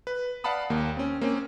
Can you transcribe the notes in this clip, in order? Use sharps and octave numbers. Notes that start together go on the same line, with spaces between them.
B4
D5 F5 F#5 A5 B5 D#6
D#2 A#3
C4 C#4
A#3 C4 C#4